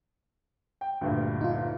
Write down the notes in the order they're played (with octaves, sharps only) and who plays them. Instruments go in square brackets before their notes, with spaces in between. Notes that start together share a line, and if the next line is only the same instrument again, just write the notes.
[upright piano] G5
D2 G2 A#2
[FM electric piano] D#4 F4